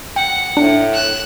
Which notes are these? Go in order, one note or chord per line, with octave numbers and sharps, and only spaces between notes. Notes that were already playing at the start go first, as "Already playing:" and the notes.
F#5 G5
A2 D4 C#7
F#6 E7